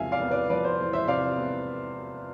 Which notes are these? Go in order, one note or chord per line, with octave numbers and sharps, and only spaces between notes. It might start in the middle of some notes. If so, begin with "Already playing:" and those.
Already playing: E2 C3 F3 E5 F5 G#5
D5 F5
B3
B4 D5
F3 B4 D5
C5
E2
C5 E5
C3 D5 F5
B3